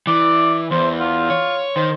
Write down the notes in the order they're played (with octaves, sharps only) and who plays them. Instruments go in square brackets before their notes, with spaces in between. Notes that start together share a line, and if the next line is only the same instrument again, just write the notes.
[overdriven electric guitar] E3 [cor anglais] D5
[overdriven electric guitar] E2 [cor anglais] C5
[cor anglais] F4
[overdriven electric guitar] C#5
[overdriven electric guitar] D#3 [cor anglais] C5